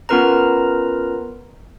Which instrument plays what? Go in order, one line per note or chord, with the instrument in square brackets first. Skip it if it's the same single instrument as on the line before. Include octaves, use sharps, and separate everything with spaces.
[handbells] B3 C#4 F4 A#4 B4 A#5